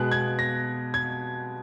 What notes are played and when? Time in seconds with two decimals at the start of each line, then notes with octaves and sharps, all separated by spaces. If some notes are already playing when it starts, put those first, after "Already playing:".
Already playing: B2 G#3 B3 F#6
0.11 G#6
0.39 A#6
0.94 G#6